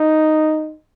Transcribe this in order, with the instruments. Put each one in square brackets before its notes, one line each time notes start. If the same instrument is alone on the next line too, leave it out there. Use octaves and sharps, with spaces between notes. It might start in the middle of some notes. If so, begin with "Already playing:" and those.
Already playing: [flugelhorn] D#4